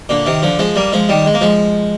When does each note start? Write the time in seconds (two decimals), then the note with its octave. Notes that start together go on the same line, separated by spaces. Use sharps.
0.09 A#2 D3
0.26 C3 D#3
0.42 D3 F3
0.59 F3 G#3
0.76 G3 A#3
0.93 F3 G#3
1.09 D#3 G3
1.26 G#3
1.34 A#3
1.41 F3 G#3